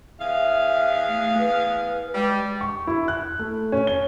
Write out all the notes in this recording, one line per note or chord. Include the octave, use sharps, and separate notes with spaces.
E2 G#4 E5 F5
A3
B4
G3 G#3
C#6
E4
F#6
A3
C#4
G7